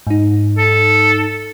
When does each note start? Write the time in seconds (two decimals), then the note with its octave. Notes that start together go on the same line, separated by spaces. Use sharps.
0.07 G#2 D#4
0.58 A4